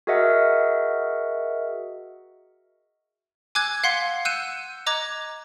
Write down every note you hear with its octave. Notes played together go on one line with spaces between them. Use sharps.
F#4 G#4 A#4 D#5 E5 F#5
G#5 D6 E6 F#6 G#6
F5 F#5 C6 G#6 B6 C#7
E6 F#6 G6 C#7 D#7 E7
D#5 A#5 D6 F#6 G#6